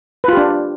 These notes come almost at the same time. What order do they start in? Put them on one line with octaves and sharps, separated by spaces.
B4 F4 G4 D4